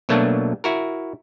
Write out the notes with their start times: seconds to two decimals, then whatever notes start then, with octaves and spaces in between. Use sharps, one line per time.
0.09 B2 F#3 A3 A#3 D4
0.64 E4 F#4 A#4